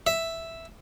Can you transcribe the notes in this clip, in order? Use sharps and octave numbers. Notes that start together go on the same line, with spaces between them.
E5